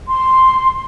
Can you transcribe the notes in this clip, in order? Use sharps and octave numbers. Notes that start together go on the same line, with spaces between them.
C6